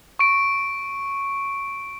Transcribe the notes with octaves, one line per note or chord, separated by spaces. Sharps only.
C#6 D7